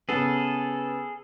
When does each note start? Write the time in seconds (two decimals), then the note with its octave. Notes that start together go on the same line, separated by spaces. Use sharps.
0.09 C#3 B3 G#4 A4